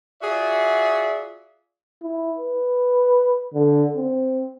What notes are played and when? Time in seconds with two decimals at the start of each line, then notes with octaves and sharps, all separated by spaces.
0.22 F4 F#4 G#4 D5 E5
2.03 E4
2.38 B4
3.54 D3
3.96 C4